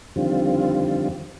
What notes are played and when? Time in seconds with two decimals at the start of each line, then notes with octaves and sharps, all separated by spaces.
0.16 F2 D3 D#3 G3 C4 F4